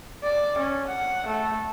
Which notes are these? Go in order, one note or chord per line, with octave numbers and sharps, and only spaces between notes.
D5
C#4
F#5
A3